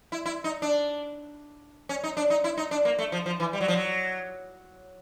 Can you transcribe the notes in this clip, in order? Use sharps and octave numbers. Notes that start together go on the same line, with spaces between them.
E4
E4
D#4
D4
C#4
D#4
D4
D#4
E4
D#4
D4
A#3
A3
F3
F3
E3
G3
F#3
F3
F#3